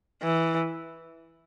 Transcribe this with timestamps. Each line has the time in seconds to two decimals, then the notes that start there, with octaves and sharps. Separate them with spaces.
0.23 E3